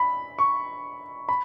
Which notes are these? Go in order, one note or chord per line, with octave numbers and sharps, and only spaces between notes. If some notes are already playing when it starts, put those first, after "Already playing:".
Already playing: B5
C#6
B5